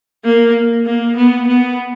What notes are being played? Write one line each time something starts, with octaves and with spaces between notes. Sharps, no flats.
A#3
A#3
B3
B3